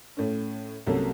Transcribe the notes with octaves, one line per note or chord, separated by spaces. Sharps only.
A2 A3 C#4
C2 C3 F#3 A#3 C#4 A4